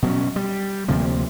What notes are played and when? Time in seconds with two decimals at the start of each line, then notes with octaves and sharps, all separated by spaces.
0.02 B2 F#3 C#4
0.36 G3
0.88 D2 C3 F3 A#3